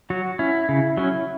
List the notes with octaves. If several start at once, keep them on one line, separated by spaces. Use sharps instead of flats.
F#3 F#4
C#4 E4
C#3
F#3 C#4